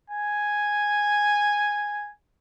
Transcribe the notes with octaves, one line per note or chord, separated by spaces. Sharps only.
G#5